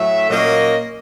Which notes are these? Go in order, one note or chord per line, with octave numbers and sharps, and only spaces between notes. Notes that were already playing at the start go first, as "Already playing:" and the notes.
Already playing: A2 F#3 A3 E5
A#2 F#3 A#3 C#4 D#5